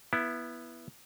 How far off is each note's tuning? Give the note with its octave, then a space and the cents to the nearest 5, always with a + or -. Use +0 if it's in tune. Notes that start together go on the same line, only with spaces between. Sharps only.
B3 -10 E4 +10